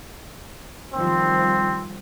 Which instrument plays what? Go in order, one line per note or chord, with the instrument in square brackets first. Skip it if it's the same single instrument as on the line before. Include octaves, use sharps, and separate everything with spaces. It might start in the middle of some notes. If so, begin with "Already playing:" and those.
[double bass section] D#3 F3 G3 [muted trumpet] C4